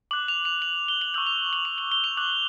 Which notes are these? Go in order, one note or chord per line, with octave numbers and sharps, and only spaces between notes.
D6 F#6 F#7
F7
F7
F#7
G7
F#7
C#6 E6 G6 F#7
F7
F#7
F7
F#7
G7
F7
D6 F#6 F#7